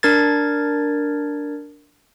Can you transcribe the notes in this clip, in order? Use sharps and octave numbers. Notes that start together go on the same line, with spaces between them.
D4 A#4 G#6 A6